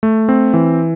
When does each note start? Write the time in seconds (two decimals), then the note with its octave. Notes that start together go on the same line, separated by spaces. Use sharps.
0.03 A3
0.29 C4
0.54 E3